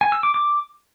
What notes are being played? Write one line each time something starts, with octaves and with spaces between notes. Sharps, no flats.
G#5
E6
D6
D6